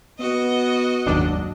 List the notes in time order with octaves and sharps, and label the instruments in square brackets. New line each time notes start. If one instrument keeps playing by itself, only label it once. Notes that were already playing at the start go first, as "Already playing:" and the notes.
[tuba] B3 [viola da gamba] F#4 D#5
[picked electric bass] F#1 G#2 F#3 [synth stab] D#2 D4